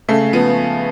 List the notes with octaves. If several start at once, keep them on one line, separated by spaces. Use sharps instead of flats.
C#3 A3
F3 B3